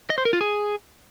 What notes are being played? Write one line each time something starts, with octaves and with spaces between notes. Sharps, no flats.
D#5
C5
A#4
F4
G#4